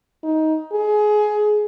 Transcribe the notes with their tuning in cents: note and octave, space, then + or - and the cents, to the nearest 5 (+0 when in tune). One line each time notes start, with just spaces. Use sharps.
D#4 +15
G#4 +20